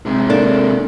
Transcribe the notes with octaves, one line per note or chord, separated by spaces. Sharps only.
C3 G#3
A#3 D4 A4